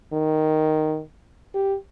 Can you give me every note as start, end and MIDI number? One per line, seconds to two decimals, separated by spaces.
0.13 1.01 51
1.54 1.75 67